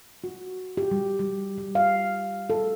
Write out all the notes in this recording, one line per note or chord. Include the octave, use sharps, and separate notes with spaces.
F#4
G4
G3
G3
G3
F5
A4